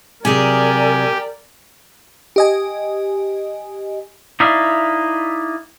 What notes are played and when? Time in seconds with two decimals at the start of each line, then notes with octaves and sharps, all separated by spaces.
0.25 C3 F#3 G4 G#4 A#4 D5 G#5
2.36 G4 D#5 G#5
4.40 D#4 E4 D5 E5 F5